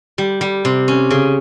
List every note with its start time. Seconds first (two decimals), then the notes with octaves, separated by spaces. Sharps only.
0.18 G3
0.41 G3
0.65 C3
0.88 C#4
1.10 C#3